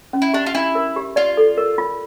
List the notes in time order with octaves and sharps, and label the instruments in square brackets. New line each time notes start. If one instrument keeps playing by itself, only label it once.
[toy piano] C#4
[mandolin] E4
[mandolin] D4 [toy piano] G4
[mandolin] F4
[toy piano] D4 [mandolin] E4
[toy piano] A#4
G4
[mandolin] F4 [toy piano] D5
[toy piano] A4
A#4
F4